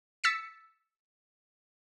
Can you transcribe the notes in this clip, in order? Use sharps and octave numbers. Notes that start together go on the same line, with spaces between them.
E6 A6 B6 C#7